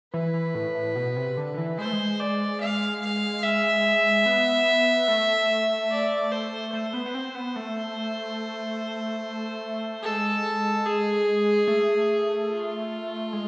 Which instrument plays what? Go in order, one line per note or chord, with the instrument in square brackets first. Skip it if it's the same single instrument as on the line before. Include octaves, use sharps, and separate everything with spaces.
[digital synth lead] E3 [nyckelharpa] B4
[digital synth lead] E3
A2
A2
B2
C3
D3
D3
E3
[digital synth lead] G#3 [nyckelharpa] C5
[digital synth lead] A3
G#3
[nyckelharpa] D5
F5
F5
E5
[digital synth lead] B3
A3
[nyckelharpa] D5
C5
[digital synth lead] A3 [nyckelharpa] C5
[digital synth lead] B3
B3
C4
B3
A3
[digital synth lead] G#3 [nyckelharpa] A4
[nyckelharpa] G#4
[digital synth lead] A3
[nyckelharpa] F4
[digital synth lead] G#3